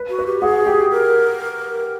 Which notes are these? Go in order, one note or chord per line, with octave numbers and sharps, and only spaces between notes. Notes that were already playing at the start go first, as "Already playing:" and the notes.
Already playing: B4
F#4
B4
G4
F#4 G#4
G4
A#4